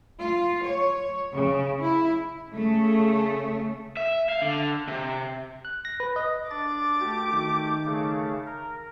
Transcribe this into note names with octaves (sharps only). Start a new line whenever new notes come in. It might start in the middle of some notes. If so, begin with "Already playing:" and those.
F4
C#5
C#3
E4
C#3 A3
E5
F5
D3
C3
F#6
A#6
B4
D#5
D4 D5 D6 A6
A3 F#4 G4
D#3
C#3 A3
A#4